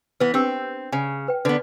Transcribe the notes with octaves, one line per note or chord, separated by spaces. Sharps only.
E3 B3 B4
C4 D4 G4 E6
C#3 G#5
B4 G5
D3 B3 B4